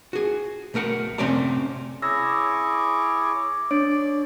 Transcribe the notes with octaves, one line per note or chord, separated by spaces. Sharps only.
F#4 G#4
B1 A3 A#4 F#5
C3 A3 C4 C#4 D5 A#5
E4 G#4 C#5 D6 E6 A#6
D4 C#5 D5 D7